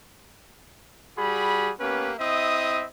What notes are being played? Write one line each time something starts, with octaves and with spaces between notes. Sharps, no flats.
G3 F#4 G#4 B5
A#3 B3 C#4 G4 B4
C4 E4 D#5 E5 D#6